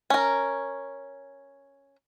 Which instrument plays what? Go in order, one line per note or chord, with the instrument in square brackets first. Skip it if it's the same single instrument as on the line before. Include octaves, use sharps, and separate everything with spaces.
[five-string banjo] C#4 A#4